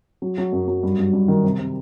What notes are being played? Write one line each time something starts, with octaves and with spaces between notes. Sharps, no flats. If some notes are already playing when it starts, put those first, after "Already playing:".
F#3
F#3
F#2
F#3
G2
G2
G2
D#3
C3
C3